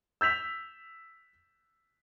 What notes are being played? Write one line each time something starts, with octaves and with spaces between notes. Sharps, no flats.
E6 G6 B6 F7